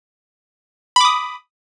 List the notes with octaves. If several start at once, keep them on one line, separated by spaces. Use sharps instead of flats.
B5 D6 D#6